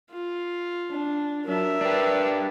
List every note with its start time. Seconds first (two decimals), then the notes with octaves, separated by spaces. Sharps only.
0.11 F4
0.91 D4
1.46 F#3 D4 A#4 E5
1.81 D4 G4 B4 D5